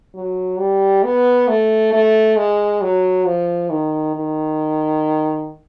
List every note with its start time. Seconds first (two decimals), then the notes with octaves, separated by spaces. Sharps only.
0.15 F#3
0.59 G3
1.04 B3
1.48 A3
1.93 A3
2.37 G#3
2.82 F#3
3.26 F3
3.70 D#3
4.15 D#3